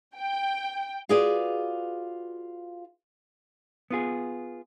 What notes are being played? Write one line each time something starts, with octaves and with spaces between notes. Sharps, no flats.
G5
F4 F#4 G#4 B4 D5
B3 F4 G#4